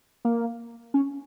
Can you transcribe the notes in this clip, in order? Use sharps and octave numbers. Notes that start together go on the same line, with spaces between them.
A#3
C#4